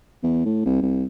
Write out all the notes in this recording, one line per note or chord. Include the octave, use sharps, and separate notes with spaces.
E2
A2
C2
C2